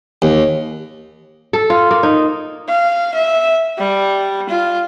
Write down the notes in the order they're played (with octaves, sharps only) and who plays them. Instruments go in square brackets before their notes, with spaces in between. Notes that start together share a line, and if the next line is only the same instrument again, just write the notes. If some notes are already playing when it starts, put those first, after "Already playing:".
[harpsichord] D#2
[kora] A4
F4
A#3
D#4
[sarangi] F5
E5
G3
F4